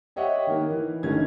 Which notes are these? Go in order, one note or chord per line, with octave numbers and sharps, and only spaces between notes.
G4 C#5 D#5 E5 F#5 G5
D#3 A#3
E3
G1 D3 D#3 A3 C#4 G#6